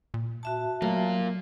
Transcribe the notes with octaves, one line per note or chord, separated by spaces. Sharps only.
A#2
F#4 E5 A5
F#3 A3 A#3 F4